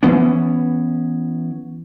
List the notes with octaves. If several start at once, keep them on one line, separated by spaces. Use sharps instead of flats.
E3 B3 C#4